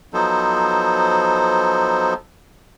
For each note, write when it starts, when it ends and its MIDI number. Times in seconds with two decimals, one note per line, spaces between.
0.13 2.14 53
0.13 2.14 54
0.13 2.14 59
0.13 2.14 63
0.13 2.14 69
0.13 2.14 72